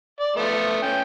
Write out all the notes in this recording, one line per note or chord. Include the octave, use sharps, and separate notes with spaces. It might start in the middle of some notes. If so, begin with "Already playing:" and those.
D5
F3 A3 B3
C#4 G5